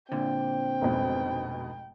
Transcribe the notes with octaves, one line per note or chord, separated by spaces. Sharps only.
A#2 D3 C4 G5
F1 G#2 B2